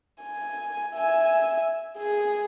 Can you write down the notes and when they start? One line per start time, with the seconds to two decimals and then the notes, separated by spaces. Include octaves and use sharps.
0.22 G#5
0.95 E5 G#5
1.98 G#4